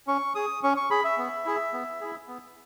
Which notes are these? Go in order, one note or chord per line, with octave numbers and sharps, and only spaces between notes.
C#4 C#6
G#4 D#6
C#4 C#6
C#6
G#4 B5
E5
B3
E4 G#4
B3
E4 G#4
B3